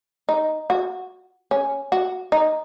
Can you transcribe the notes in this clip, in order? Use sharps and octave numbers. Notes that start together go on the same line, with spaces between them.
D#4
F#4
C#4
F#4
D#4